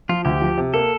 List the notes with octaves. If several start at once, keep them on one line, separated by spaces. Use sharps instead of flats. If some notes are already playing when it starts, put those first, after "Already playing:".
F3 F4
D2 G4
F3
C3
A#3 A4